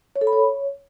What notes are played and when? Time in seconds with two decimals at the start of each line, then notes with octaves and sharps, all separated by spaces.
0.16 C#5
0.21 A4
0.27 B5
0.33 C#5